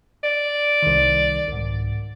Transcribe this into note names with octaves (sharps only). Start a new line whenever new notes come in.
D5
C2 D#3
C2 G#2